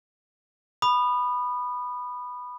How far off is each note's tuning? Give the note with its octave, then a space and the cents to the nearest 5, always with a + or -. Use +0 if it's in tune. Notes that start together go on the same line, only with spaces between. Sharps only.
B5 +0 D#6 -30